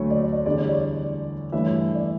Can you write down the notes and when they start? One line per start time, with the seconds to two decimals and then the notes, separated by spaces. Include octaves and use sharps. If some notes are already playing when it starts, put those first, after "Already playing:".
Already playing: D2 D3 F#3 A3 C#5
0.10 D5
0.19 C#5
0.32 D5
0.46 E2 D3 G3 D5
0.58 C#5
0.69 D5
1.52 G2 E3 A3 C#5 E5
1.95 D5